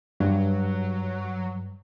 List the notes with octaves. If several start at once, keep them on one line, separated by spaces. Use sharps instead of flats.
G2 F#3